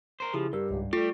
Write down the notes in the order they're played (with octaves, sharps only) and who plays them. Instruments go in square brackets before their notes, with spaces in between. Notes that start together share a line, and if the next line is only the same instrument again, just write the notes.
[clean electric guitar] A#4 C5
[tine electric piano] C#3 E4 G#4 [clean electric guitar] F3 [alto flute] G4
[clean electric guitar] G2 [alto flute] G4 [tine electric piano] A#4 E6
[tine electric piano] C#2 G#2
[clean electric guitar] G3 G4 [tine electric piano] A3 [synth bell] F4 [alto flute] A4